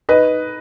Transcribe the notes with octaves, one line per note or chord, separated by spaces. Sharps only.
D#4 B4 D#5